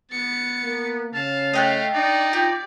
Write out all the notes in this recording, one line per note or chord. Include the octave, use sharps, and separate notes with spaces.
B3 A6 C#7
A#3
C#3 F5 A5
A3 D#5 G5 F#6
D4 D#4 D5
F4 G4